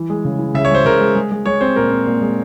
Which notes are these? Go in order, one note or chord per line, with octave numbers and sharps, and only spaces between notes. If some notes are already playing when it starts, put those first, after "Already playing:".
Already playing: E3
G#3
C#3
E3
C#3 E5
C#5
G#3 C5
C#3 A#4
G#3
G#3
G#3
G#3 C#5
C4 C5
A#2 A#4
C4
A#2
G#3